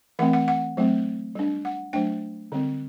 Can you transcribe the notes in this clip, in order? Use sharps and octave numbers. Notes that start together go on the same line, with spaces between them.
E3 A3 C4 F#5
F#5
F#5
F#3 A3 C4
G3 D4
F#5
F#3 A3 D4 G5
D3 G3 C4